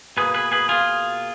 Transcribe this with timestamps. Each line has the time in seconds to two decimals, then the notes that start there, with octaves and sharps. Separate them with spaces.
0.17 B2 A#3 G#4 B4
0.34 G#4 B4
0.52 G#4 B4
0.69 F4 G#4